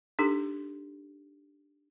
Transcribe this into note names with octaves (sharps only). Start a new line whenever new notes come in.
D4 D#4 G4 A4